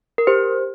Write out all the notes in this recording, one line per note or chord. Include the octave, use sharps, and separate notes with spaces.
A#4
G4 C5